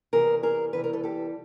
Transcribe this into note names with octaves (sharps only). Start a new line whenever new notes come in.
E2 C3 E3 G3 G#4 A#4
G#4 A#4
E2 C3 E3 G3 B4
A#4
A4 B4
G4 A4